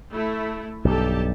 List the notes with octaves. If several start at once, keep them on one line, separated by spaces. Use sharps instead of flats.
A3 E4
B1 G2 G4 A4 A5